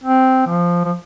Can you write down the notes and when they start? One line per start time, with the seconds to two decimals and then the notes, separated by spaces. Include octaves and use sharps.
0.03 C4
0.47 F3
0.85 F3